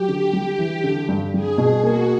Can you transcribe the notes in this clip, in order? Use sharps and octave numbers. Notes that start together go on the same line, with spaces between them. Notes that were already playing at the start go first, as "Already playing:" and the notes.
Already playing: F#3 G4
D3
G3
E3
D3
G2
G3 G#4
B2
A#3 F#4